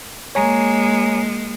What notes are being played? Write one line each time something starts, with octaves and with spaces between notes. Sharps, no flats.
G#3 A#3 C#5 G#5 A#5